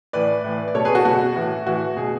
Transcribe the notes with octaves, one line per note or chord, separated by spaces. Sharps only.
A2 E3 B4 D5
A2 E3
D5
B2 A4 C#5
G#4 B4
F#4 A4
B2 F#4
A2 E3
A2 E3 F#4
B2 G#4